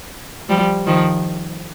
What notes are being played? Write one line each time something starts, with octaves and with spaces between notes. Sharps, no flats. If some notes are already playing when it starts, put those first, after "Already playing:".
F3 G3
D#3 F3